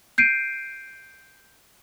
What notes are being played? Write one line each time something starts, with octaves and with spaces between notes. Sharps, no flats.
G6 C7 D7 D#7